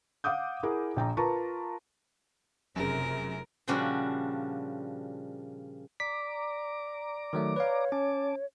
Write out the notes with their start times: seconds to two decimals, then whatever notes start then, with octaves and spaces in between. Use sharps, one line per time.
0.24 F5 F#5 D6 D#6 G6
0.63 E4 G#4 A#4 F#5 D6
0.96 A#1 G5 A#5
1.17 F4 A#4 B4 A5 A#5 C#6
2.76 F1 F#2 C#3 A#4
3.67 A#2 C#3 F3 G3 D4 F#4
6.00 D5 A#5 D6 B6
7.33 D#3 F#3 A3
7.56 B4 C#5 F5
7.92 C#4 A5 D6